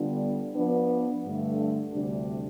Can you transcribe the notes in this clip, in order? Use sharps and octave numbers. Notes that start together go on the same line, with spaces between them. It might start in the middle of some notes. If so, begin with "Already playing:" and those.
Already playing: D3 G3 B3 D4 F4
F3 B3 D4
G2 D3 A3
D2 C3 G3 D4